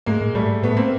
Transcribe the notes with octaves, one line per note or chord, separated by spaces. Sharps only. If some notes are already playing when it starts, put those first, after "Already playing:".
G#2 G#3 A#3
A2
G#2 G3 A3
A2 A3 B3
A#3 C4